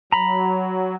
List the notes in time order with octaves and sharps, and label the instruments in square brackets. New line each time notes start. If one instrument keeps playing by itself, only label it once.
[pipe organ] F#3 [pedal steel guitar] A#5 B5